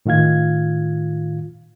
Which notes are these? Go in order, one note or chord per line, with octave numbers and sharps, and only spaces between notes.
A2 D#3 F4 F5 G#6